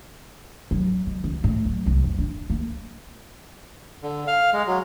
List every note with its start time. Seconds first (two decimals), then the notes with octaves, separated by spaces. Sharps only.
0.71 F#3
1.07 D#3
1.24 C#2
1.44 A2
1.66 F#3
1.86 C2
2.04 F2
2.19 D4
2.50 A#3
4.03 D3
4.27 F5
4.53 G#3
4.67 F#3